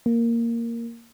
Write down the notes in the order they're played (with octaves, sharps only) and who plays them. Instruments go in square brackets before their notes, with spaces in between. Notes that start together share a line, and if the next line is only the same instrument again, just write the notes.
[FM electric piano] A#3